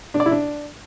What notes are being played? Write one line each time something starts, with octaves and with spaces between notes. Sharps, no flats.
D4
D5
E4
D4